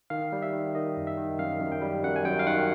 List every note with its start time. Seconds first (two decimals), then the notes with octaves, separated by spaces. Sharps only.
0.10 D#3 F5
0.32 G3
0.42 E5
0.53 D#3
0.75 D#3 D#5
0.97 F#2
1.07 E5
1.18 D#3
1.39 F#2 F5
1.60 F#2
1.72 G5
1.82 G3
2.03 F#2 F#5
2.16 G#5
2.25 F#2 G5
2.39 F5
2.47 D#3 F#5